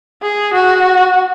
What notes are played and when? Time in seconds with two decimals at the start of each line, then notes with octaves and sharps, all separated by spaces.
0.22 G#4
0.54 F#4